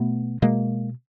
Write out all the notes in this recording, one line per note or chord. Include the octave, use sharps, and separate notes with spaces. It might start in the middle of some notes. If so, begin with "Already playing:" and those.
Already playing: B2 A3 B3
B2 G#3 A#3